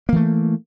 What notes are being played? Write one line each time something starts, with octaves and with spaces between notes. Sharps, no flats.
E3 A3 A#3